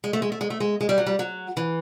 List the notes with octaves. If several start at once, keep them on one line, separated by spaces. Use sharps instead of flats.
G#3
A3
G#3
A3
G#3
A3
G#3
G#3
G3
F#3
G3
F#3
E3